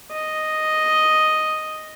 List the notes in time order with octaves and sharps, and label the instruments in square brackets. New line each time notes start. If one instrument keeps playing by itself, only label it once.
[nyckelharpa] D#5